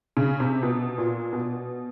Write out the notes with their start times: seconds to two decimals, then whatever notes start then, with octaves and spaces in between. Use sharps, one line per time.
0.17 C#3
0.40 C3
0.63 B2
0.98 A#2
1.33 B2